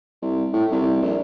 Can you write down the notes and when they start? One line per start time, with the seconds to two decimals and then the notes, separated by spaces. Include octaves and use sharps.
0.22 C2
0.53 A2
0.71 C2
1.02 A#1